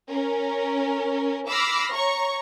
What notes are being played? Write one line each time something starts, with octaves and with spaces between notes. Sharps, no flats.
C#4 A#4
B5 D6 E6 F6 A#6 C7
C#5 A#5 C#6